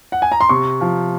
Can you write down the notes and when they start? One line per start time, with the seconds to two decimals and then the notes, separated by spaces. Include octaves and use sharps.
0.12 F#5
0.22 G#5
0.32 A#5
0.41 C6
0.49 C3 C#6
0.81 F3